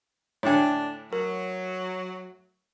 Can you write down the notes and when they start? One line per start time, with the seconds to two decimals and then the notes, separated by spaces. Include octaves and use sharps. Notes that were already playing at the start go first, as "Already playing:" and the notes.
0.43 A2 D3 D4 C#5 G5 G#5
1.13 F#3 A#4